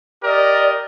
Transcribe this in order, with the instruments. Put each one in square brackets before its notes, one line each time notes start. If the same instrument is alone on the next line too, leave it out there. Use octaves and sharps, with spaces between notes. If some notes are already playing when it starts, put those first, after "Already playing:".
[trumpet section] G4 A#4 D#5 [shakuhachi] D5